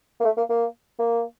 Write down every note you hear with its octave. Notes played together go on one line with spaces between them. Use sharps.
A#3
A3
A#3
A#3
A#3